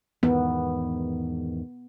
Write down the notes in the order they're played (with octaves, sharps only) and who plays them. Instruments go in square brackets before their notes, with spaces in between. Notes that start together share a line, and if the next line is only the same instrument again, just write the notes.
[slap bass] E2 G#2 D#3 [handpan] B3